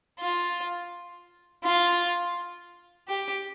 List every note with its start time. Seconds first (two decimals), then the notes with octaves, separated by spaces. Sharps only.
0.19 F4
1.64 F4
3.08 G4